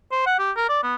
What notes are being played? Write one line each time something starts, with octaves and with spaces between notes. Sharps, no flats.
C5
F#5
G4
A#4
D5
B3